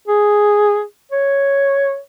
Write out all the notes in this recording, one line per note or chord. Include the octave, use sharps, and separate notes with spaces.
G#4
C#5